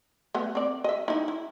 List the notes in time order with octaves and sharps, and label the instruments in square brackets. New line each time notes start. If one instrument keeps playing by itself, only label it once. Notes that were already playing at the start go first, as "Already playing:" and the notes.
[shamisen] A3 B3
C4 D5
D#5 E5
D#4 E4
E4